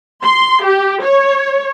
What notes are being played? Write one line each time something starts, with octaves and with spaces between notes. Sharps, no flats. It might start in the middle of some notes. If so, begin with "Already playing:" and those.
C6
G4
C#5